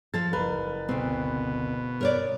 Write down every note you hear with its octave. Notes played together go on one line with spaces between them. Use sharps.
F3 A4 A6
F#1 A#4 B4
D2 B2 C4
A#4 C#5 D5